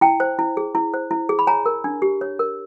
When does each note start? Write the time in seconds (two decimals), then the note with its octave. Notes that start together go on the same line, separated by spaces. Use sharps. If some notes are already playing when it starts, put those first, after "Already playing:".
0.01 E4 G5 A5
0.20 C5
0.39 E4
0.57 G#4
0.75 E4
0.94 C5
1.11 E4
1.29 G#4
1.39 B5
1.47 C#5 G#5 A#5
1.66 A#4
1.84 D4
2.02 G4
2.21 C#5
2.39 A#4